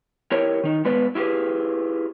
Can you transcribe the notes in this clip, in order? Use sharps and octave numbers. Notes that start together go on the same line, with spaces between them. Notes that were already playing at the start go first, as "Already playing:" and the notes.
E4 G4 A#4 C#5
D#3 D#4
G#3 B3 F4 B4 D5
E4 F4 G4 G#4 B4